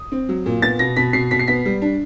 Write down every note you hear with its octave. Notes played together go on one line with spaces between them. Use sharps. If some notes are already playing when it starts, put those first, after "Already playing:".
Already playing: D#6
C4
F#3
A#2
B3 A6
B2 A#6
B2 B6
B2 C7
B2 B6
C7
B3 B6
G3
D4